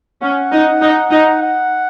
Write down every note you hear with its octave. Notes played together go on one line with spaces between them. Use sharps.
C#4 F#5
D#4
D#4
D#4
F#5